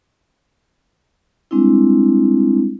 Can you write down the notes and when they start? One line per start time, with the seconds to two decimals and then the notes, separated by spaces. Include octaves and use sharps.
1.51 G3 G#3 C4 D4 E4